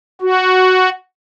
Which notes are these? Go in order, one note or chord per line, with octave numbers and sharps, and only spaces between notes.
F#4